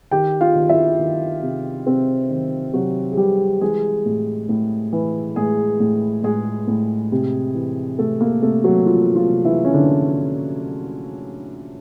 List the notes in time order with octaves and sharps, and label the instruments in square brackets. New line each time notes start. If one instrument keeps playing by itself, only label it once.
[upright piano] D#3 G4 G5
F4 F5
D#3
E4 E5
D#3
C3
C3 C4 C5
D#3
C3 F#3 F#4
G#4
C3 G3 G4
E3 G#3 G#4
A2
A2
E3
A2 G#3 G#4
A2
A2 G#3 G#4
A2
C3
E3
C3 A3 A4
A#3 A#4
C3 A3 A4
F#3 F#4
E3 F3 F4
F3 F4
C3
E3 E4
C#4
D3 E3 D4